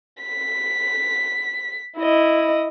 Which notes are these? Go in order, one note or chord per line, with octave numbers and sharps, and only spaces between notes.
B6
E4 D#5